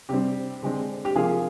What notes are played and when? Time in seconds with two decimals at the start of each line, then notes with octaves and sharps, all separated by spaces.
0.09 C3 G3 C4 G4
0.63 D3 G#3 C4
1.05 G4
1.15 C3 F3 A#3 F4 G#4